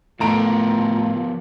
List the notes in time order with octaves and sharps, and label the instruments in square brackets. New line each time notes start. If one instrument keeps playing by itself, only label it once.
[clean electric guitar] A2 [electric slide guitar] F3 B3 A#4 [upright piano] A3 A#5 D7 [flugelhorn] F4